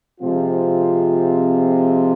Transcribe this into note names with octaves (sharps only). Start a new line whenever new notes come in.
C3 F3 G#3 C4 F4